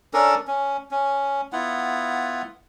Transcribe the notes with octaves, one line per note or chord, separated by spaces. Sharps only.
C#4 D4 A4 A#4
C#4
C#4
B3 E4 F4 F#5